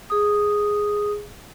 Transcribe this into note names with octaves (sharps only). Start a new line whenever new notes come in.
G#4 D#6